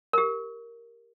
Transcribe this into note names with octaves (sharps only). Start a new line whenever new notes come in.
G4 A#4